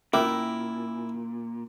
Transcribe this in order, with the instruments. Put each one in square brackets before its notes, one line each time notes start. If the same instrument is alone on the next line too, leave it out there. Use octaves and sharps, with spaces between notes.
[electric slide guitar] A#2 [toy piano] C#4 [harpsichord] E4 [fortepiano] A#4 E5 D6